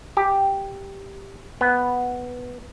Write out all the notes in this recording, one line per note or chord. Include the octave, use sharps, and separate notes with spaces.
G4
B3